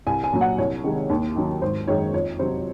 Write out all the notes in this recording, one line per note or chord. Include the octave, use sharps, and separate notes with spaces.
C2 G#5
G#5
A#2 F#3
F#5
C2 C#5
C3 D#3 G#3
D#2
D#3 F#3
G#1 C5
F#2 D#3 G#3 C#5
F2 C#5
C3 F#3 C5